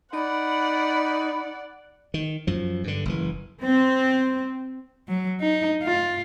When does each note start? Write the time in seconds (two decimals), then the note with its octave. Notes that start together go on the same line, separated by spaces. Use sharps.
0.13 D#4 D5 F#5 B5
2.14 D#3
2.47 F#2 F3
2.84 G2 D3
3.05 F#1 E3
3.63 C4
5.09 F#3
5.41 D#4
5.83 F4